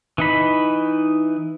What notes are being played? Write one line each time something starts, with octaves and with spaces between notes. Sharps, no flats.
E3 D#4 B5